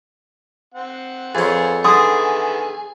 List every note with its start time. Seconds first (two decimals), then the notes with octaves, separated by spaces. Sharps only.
0.74 C4 F#5
1.35 F2 B3 C#4 F4 G#4 C5
1.85 D3 D#3 B3 G#4 E5 C6 D#6